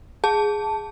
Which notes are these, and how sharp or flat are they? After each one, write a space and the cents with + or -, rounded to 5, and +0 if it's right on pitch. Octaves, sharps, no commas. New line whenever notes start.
G#4 +0 A5 +0